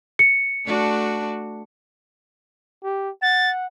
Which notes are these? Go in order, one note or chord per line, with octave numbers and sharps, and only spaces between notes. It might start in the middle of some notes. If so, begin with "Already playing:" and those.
C#7
A3 D4 F#4
G4
F#5 A6